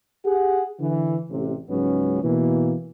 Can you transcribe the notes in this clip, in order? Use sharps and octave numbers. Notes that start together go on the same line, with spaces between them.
G4 G#4 F#5
D3 E3
A1 C3
C#2 G#2 F#3 B3 C#4
B2 E3 A#3